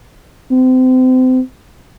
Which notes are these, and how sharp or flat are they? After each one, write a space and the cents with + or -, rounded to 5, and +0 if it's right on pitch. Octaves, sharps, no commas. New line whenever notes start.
C4 -30